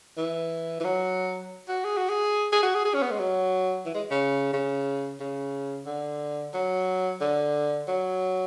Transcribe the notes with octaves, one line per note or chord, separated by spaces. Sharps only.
E3
E3
F#3
F#4
G#4
F#4
G#4
G#4
F#4
G#4
G#4
C#4
B3
G#3
F#3
E3
G#3
C#3
C#3
C#3
D3
F#3
D3
F#3